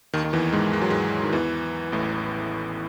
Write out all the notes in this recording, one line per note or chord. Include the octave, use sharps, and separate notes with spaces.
D#2 D#3
D#3
E2 E3
G#2 G#3
G#3
F#3
G#2 G#3
D#3
E2 E3
A1 A2